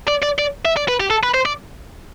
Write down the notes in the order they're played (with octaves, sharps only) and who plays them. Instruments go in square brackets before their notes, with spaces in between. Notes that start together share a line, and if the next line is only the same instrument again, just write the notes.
[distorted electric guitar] D5
D5
D5
E5
D5
B4
G4
A4
B4
C5
D5